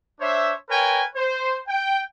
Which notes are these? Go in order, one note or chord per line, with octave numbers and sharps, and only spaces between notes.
D4 C5 C#5 E5
A#4 B4 C#5 G5 G#5
C5
G5